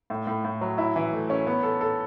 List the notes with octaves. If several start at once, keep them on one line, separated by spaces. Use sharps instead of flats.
A2
A2
A2
F#3
E4
E3
A3
C#4
B3
A4
A4